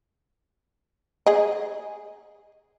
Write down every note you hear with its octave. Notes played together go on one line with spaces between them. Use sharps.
G#4 D#5